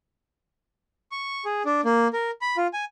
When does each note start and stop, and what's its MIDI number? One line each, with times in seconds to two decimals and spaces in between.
1.12 1.44 85
1.45 1.63 68
1.65 1.81 62
1.85 2.08 58
2.13 2.31 70
2.41 2.57 83
2.57 2.67 65
2.73 2.85 80